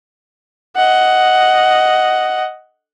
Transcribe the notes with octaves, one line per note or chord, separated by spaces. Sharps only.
D#5 F#5